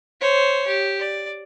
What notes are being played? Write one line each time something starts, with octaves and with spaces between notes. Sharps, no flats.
C5 C#5
G4
D5